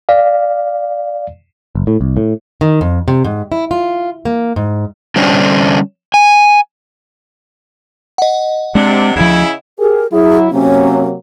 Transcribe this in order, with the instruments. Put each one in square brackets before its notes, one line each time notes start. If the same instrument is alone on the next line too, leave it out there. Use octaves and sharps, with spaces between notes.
[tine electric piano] D5 F5
[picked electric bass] F#1
A2
C2
A2
[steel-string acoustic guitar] D#3
F2
C3
G#2
E4
F4
A#3
G#2
[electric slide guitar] D3 G3 C#4 D4 C5
G#5
[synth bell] D#5 F#5
[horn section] C3 D4 [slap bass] G#3 C4
[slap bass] D2 F3 [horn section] C#3 C#4 E4
[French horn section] G4 G#4 [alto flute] A#4
[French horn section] F#3 E4 [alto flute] G#4
[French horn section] C3 F#3 A#3 [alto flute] C#4